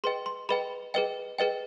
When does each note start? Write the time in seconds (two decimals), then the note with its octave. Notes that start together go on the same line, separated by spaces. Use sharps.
0.04 G#4 B4 D#5 G5 C6
0.26 C6
0.49 G#4 B4 D#5 G5 B5
0.94 G#4 B4 D#5 G5
1.38 G#4 B4 D#5 G5